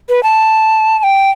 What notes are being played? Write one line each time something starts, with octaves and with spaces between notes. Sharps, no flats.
B4
A5
A5
G5